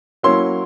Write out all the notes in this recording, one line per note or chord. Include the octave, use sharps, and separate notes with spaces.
F#3 A#3 C#4 E4 C6